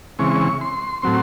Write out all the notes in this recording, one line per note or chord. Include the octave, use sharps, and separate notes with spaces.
C#3 E3 G#3 C4 C#6
C6
A2 F#3 C4 C6